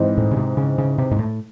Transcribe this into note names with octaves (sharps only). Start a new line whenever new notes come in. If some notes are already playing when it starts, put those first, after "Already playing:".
Already playing: G#2 E3 C4 D#4
A2
C#3
C3
C#3
C#3
C3
G#2
A2